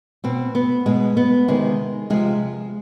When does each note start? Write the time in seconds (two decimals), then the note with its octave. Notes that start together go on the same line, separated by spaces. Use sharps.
0.24 B2 C4
0.55 B3
0.86 B2 G#3
1.17 B3
1.48 C3 D#3 G#3
2.10 C3 F3 G#3